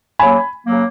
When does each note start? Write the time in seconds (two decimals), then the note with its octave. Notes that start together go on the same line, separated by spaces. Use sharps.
0.19 C#3 F#3 A#3 G#5 B5
0.66 C#3 F#3 A#3